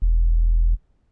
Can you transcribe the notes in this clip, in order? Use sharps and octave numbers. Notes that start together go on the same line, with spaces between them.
E1